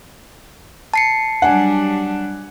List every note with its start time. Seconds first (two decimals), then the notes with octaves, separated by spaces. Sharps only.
0.94 A5 C7 C#7
1.42 F#3 G3 D4 F#5 G#5